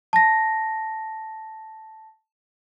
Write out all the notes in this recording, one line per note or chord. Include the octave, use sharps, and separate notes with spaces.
A5 A#6